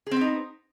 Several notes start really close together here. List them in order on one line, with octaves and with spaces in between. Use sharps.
G#4 C4 B3 D#4